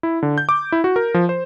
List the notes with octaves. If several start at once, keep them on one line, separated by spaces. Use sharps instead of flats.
E4
D3
G6
D6
E4
F#4
A#4
F3
C5